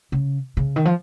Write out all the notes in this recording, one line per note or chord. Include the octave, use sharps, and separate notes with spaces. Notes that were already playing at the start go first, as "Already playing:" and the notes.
C#3
C#3
D#3
F3